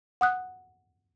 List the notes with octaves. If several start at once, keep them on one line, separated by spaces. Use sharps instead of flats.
F#5 D#6 F#6